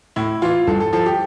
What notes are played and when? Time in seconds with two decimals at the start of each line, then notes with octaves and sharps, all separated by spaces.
0.16 A2 E4
0.42 E3 F4
0.67 G2 A4
0.80 A4
0.93 F3 A4
1.06 G4